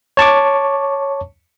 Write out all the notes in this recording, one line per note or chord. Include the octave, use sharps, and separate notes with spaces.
C#5 A5 C#6 D6